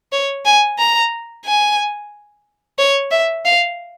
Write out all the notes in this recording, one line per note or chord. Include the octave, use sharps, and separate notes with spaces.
C#5
G#5
A#5
G#5
C#5
E5
F5